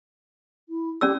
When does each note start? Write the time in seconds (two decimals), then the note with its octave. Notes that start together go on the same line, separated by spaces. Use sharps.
0.69 E4
1.01 C#4 G4 D5 E6